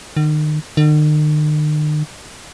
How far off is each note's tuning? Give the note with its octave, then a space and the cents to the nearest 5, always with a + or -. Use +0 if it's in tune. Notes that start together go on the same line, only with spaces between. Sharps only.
D#3 -35
D#3 -45